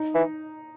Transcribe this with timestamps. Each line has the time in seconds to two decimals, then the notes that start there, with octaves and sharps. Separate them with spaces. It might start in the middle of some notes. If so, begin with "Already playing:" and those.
Already playing: D#4
0.15 E3